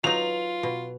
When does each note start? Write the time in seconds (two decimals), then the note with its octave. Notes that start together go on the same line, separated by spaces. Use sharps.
0.04 F#3 D#4 F4 B4 F7
0.63 B2